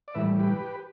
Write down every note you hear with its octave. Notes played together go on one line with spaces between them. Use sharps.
D5
A2 E3 G3 B4 E5
G4 B4